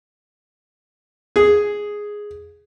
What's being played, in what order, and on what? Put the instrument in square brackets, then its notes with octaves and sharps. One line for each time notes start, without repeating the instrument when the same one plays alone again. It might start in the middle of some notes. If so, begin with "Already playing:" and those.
[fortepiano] G#4